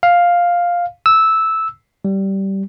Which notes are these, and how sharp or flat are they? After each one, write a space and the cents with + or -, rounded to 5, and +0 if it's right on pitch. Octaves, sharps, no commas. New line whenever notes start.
F5 +5
E6 -10
G3 -15